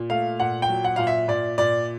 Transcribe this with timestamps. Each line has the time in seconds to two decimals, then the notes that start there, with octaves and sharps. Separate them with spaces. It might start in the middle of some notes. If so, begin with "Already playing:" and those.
Already playing: A#2
0.10 A3 F5
0.40 A#2 F#5
0.62 G5
0.69 F#3
0.84 F#5
0.96 A#2 F5
1.07 E5
1.28 A#2 D5
1.58 A#2 D5